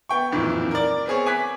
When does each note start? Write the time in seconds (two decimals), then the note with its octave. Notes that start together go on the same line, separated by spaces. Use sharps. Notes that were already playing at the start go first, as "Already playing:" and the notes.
0.09 B3 G5 C#6
0.32 D1 F2 A#2 D#3 E3
0.71 A#4 D5
1.06 B3 C4 G#4 C#5
1.26 G#5 D6 F#6 B6